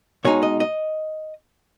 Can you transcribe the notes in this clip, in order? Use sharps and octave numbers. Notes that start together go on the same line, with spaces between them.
B2 G#3 D#4 C#5
D#5
D#5